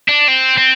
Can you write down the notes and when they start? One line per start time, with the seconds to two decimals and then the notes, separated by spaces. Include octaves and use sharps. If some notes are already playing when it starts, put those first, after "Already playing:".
0.08 D4
0.28 C4
0.58 C4